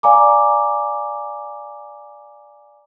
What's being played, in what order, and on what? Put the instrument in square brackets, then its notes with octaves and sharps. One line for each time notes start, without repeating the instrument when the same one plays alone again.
[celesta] D5 F5 G#5 A#5 D6